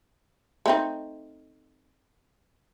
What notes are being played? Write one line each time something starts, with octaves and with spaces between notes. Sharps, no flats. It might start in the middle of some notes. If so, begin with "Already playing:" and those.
A3 C4 D#4